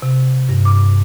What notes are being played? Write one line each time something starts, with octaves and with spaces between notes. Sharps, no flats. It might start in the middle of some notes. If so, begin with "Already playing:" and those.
C3
G2
D6